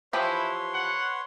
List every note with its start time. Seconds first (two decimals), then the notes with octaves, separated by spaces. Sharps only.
0.13 E3 F3 E4 G4 B4 C#5 C6
0.74 F#5